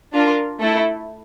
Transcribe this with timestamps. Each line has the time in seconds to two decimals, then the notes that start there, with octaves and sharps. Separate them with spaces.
0.14 D4 F4 A#4
0.61 A3 E4 A4